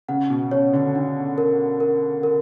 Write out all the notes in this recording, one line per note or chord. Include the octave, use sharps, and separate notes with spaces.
C#3 F#5
B2
C#3 C#5
D3
D4
A#4
A#4
A#4